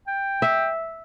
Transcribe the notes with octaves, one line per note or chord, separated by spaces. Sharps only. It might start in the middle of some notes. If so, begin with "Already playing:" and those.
G5
E5